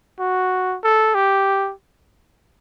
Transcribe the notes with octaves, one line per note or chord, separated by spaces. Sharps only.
F#4
A4
G4